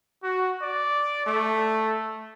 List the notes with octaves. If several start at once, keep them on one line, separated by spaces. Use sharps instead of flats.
F#4
D5
A3